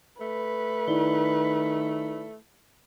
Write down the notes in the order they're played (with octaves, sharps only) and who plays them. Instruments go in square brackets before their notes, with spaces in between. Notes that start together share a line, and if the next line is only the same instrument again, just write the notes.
[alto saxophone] A3 [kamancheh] B4
[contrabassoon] D#3 [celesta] E4 D5 G7